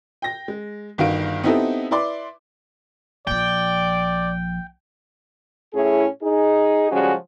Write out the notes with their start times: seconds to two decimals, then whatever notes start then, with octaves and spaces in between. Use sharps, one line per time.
0.22 G5 A#6
0.48 G#3
0.98 G1 D#3 F#4 F5 D7
1.43 B3 C4 D#4 E4 G4 A4
1.91 E4 B4 D5 C6 D6
3.27 A#1 F3 D5 G5
5.74 A2 C#4 E4 G#4
6.22 D#4 G#4
6.91 C#3 F3 G3 G#3 C#4 F#4